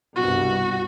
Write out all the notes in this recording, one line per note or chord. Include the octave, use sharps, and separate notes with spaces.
C2 G2 B2 F#4